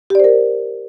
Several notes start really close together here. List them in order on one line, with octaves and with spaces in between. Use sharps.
G4 D5 C5 A#4